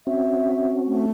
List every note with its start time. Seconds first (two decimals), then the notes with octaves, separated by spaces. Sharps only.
0.07 C4 C#4 F#4 E5
0.86 A3